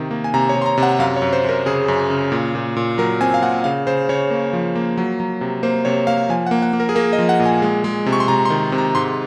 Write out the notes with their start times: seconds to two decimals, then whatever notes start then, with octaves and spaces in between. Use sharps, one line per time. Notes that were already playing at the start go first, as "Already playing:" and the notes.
Already playing: C3 D#3
0.11 A#3
0.24 G#5
0.34 C3 A#5
0.49 C#5
0.55 C3
0.62 C6
0.66 A#5
0.78 C3
0.83 F#5
0.99 F#2 F5
1.16 C#5
1.22 F#2
1.33 C5
1.44 F#2 A#4
1.66 C#3 G#4
1.88 F#2
2.10 C#3
2.32 A#2
2.55 A#2
2.76 A#2
2.98 F#3 A#4
3.21 C4 G#5
3.34 F5
3.42 A#2 F#5
3.64 C#3 F5
3.87 C#3 C5
4.09 C#3 C#5
4.30 A#3
4.53 F3
4.76 A#3
4.98 F#3
5.20 F#3
5.41 C3
5.63 A#3 C5
5.85 C3 C#5
6.07 A#3 F5
6.29 F3 G#5
6.46 F#5
6.51 A#3
6.62 F#5
6.73 A#3
6.80 A#4
6.89 G#4
6.95 A#3 A#4
7.13 D#5
7.19 F3
7.29 F#5
7.39 A#2
7.46 G#5
7.62 G#3
7.84 G#3
8.06 C3
8.13 C#6
8.20 C6
8.28 C3 A#5
8.45 C6
8.50 D#3
8.72 C3
8.78 A#5
8.95 G#2 C6